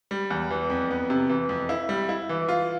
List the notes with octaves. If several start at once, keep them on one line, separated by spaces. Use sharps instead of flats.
G3
E2
E3
F2
B3
C3
E3
F2
E4
G3
E4
E3
F4